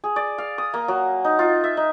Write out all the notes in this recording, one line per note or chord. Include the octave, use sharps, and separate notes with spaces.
G#4
D5
F5
D#6
A#3
F#3
D#4
F4
E5
D#4